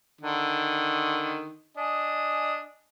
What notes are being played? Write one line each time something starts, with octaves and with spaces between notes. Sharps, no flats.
D3 D#3
D4 D#5 G#5